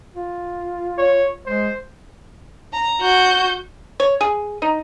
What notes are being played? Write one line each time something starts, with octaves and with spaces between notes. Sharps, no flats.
F4
C#5
G#3 C5
A#5
F#4 G6
C#5
G#4
D#4